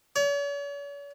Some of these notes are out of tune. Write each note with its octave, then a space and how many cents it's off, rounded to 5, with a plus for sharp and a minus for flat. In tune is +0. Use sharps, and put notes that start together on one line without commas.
C#5 +45